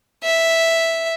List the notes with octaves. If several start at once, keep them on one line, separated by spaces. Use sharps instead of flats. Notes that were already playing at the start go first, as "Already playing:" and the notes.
E5